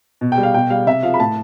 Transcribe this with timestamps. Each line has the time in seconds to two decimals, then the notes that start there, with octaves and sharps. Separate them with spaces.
0.21 B2
0.32 G5
0.38 G3
0.43 F5
0.54 B2 G5
0.70 G3 F5
0.86 C3 E5
1.03 F3 F5
1.14 B5
1.20 A2 A5